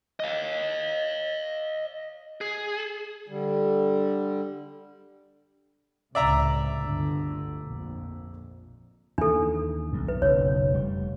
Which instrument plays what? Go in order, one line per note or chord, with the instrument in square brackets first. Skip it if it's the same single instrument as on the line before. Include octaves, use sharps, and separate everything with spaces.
[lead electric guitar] D#5 F5
G#4
[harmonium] D3 G3
[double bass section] C#2 A2 C3 [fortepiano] D5 E5 A#5
[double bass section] G1 D2 D3
A#1 F2
[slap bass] D#2 E3 [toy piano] D4 A4
[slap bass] B1 F#2
[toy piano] B4
[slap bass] F#1 B1 [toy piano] C#5
[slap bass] F1 G3